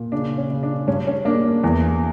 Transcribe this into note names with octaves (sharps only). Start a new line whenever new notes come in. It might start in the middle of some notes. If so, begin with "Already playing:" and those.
Already playing: A#2
C#3 D4
C#4
C#3
D4
G2 C#4
C#4
A#3 D4
E2